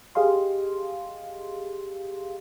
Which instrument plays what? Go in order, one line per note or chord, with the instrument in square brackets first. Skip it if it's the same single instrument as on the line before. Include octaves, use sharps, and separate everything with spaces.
[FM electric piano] G4 G#4 D#5 F5 C6